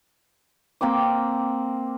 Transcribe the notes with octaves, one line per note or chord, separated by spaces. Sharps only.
A#3 C4 G5 D6